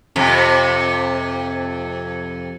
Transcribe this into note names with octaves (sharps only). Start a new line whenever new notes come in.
F2 C3